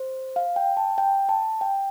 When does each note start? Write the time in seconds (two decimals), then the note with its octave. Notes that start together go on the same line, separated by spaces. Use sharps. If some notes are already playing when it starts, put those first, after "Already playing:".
Already playing: C5
0.36 F5
0.56 G5
0.77 A5
0.98 G5
1.29 A5
1.61 G5